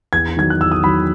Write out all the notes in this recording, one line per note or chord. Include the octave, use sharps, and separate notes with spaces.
E2 G#6
D#3 F#3 G#6
F#6
E2 E6
D#6
D#3 F#3 B5